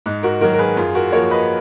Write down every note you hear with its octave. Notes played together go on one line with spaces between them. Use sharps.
G#2 D#4
F#4 A#4
D#3 F#3 F#4 A#4
A#4
G#4 B4
F#2 F4 G#4
F#4 A#4
F3 A#3 A#4 C#5
B4 D#5